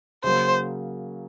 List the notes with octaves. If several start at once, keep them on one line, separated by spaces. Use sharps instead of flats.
C#3 F#3 A#3 C5